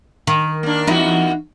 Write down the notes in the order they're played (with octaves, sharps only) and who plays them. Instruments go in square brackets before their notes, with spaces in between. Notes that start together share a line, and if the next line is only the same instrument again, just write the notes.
[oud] D#3
[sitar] A#3 D4
[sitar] E2 A#3 F#4 [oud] D#4 E4